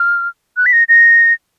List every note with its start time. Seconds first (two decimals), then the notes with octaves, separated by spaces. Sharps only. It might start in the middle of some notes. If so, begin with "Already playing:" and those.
Already playing: F6
0.57 F#6
0.66 B6
0.73 A#6
0.89 A#6